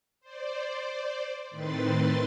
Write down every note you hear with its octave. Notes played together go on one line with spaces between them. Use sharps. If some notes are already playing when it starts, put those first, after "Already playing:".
C5 D5
A2 D#3 C4 B4 C6 A6